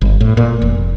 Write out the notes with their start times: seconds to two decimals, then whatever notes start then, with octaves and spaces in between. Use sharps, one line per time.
0.01 G1
0.21 A2
0.37 A#2
0.62 F1